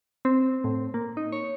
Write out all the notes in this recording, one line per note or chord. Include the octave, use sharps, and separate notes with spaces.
C4
A2
A#3
D#4
C#5